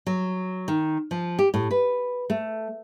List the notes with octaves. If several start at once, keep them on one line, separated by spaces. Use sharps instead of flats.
F#3
D#3
F3
G4
A2
B4
A3